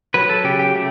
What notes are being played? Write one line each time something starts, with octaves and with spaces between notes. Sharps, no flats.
F#3 B4
A4
C#3 G4
G4
A3